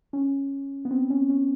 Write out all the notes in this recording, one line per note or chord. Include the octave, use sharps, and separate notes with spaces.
C#4
B3
C4
C#4
C#4